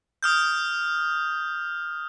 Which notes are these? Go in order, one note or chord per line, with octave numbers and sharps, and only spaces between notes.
D#6 F6 G6